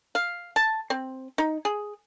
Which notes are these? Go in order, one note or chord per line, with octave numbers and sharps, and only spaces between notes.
F5
A5
C4
D#4
G#4